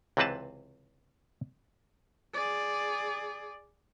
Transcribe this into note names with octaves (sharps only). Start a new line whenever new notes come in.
C#2 C3 E3 C4 B4 A5
G#4 D5